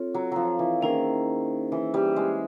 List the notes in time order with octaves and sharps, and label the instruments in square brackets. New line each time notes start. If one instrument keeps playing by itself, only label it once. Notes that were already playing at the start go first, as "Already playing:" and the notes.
Already playing: [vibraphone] C4 F4 A4 C#5
[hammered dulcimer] F#3
F3 F#3
E3
[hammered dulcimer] D#3 [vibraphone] A#3 C#4 E4 G#4 C5
[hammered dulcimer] E3
G3
G#3